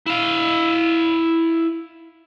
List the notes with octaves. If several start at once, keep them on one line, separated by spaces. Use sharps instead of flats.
E4 F5